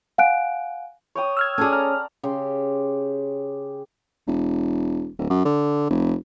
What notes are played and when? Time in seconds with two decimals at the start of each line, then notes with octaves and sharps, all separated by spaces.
0.18 F5 F#5 G#5 F#6 D7
1.15 C#5 G5 D#6
1.37 E6 F6 G#6
1.58 C#4 G#4 A4 D5
1.73 A#5 F6
2.23 C#3 G4 C6
4.27 E1
5.19 D1
5.30 F#2
5.45 D3
5.90 F1